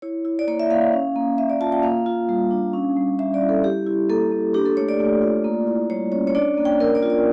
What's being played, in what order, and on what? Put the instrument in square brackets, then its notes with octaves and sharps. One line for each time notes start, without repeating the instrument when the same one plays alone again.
[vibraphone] E4 C#5
E4
D5
A#3 C#5
E5
A#3 F5
F5
C#4
A#3
A#3 E5
D5
F4 A5
G5
A#3 F5
F4
G3
D4
C#4
G3
G3 E5
D5
E4
A4
E4 G4
E4
A#3 A4
A#3
D4 G4
A4
A3 C#5
D5
A3
F4
A#3
E4
G3 C#5
C#4 C#5
C#5
D4 D5
A#3
G5
A#3 A#4
D5
F4
D5